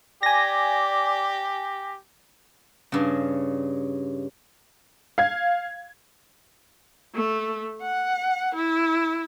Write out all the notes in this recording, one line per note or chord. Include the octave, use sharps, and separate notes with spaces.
G4 D5 G#5 A#6
G2 C#3
F5 G#6
A3
F#5
E4